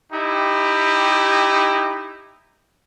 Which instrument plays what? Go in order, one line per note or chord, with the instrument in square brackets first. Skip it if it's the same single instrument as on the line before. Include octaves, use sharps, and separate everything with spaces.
[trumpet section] D#4 E4 G4